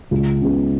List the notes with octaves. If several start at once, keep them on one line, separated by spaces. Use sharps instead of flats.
C#2
C#3 G#3 B3